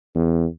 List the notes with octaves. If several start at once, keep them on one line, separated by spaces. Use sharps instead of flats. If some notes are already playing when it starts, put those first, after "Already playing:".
E2